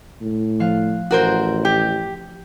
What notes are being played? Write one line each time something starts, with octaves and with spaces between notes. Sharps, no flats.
A2
F3 F5 F#6
A1 F#4 A#4 C5
G4